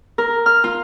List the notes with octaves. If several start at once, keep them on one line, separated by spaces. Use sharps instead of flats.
A#4
F6
F4